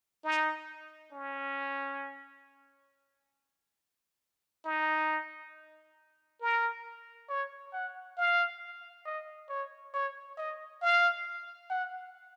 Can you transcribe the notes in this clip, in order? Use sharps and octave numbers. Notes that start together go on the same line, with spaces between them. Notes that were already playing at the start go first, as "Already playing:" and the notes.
D#4
C#4
D#4
A#4
C#5
F#5
F5
D#5
C#5
C#5
D#5
F5
F#5